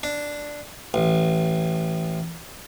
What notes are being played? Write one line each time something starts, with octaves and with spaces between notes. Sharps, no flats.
D4
A1